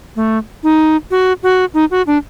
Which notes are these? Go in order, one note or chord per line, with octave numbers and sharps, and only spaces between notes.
A3
D#4
F#4
F#4
D#4
F#4
D4